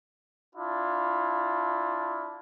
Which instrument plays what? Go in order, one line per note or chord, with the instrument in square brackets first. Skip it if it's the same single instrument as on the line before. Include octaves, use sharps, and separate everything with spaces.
[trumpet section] D4 E4 F4